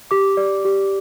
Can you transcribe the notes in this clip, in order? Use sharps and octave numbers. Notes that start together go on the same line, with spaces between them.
G4 D6
D5
G4